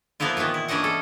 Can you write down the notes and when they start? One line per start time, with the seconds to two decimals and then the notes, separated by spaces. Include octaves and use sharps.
0.20 F3 A#3 B3 E4 F4
0.37 A#2 D#3 E3 B3
0.54 E4
0.68 E3 C#4 D4 D#5 F#5
0.84 A4